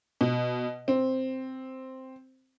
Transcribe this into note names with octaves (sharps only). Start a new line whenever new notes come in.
B2
C4